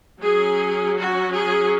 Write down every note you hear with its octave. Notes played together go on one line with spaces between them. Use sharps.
F#3 C#4 G#4
F#4
G#4